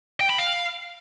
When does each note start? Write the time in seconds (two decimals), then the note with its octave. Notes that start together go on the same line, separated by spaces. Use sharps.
0.21 G5
0.30 B5
0.38 F5